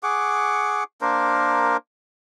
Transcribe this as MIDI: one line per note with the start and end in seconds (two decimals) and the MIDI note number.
0.03 0.84 68
0.03 0.84 78
0.03 0.84 85
0.03 0.84 86
1.01 1.77 58
1.01 1.77 62
1.01 1.77 70
1.01 1.77 72